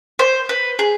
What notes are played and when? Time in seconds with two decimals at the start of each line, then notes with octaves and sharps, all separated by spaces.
0.19 C5
0.49 B4
0.79 G#4